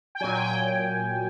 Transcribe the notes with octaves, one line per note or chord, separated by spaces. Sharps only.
G5
A#2 F#3 G#5
G5
G5